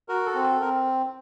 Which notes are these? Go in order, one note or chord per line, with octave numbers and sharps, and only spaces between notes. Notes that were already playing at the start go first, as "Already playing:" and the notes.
F#4 A#4
A4
C4
A4
C4 A#4